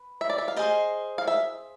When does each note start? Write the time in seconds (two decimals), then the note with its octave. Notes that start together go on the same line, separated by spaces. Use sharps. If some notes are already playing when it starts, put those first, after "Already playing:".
Already playing: B4
0.21 E5
0.30 D5
0.38 E5
0.48 F5
0.56 G#4 C5 D#5
1.18 F5
1.28 E5